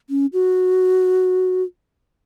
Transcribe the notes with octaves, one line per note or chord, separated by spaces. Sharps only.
C#4
F#4